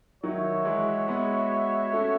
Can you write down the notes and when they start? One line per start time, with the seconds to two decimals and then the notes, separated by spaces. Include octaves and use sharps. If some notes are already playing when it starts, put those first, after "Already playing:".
0.23 D#3 F#3 F#4 C#5 E5
0.65 E3 G#3
1.08 G#3 B3
1.93 A3 C#4